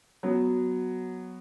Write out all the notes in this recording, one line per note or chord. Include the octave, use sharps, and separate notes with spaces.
F#3 B3